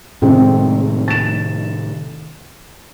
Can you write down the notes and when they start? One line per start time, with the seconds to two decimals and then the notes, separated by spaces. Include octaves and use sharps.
0.22 A2 C3 D#3 G#3 C4 G#4
1.08 A6 E7